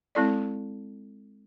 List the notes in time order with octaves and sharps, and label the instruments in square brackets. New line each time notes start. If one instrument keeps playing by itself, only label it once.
[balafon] G#3 C4 E4 A4 D5